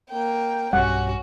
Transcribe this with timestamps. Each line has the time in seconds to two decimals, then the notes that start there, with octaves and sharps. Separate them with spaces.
0.10 A#3 G5
0.73 B1 G2 G3 C#4 F#4 F#5